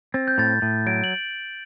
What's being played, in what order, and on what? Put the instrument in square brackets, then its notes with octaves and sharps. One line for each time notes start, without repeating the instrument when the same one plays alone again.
[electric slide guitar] C4 [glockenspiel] A6
[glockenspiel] G6
[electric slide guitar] A2 [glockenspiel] A6
[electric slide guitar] A2
[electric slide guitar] F#3 [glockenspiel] D7
[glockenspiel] F#7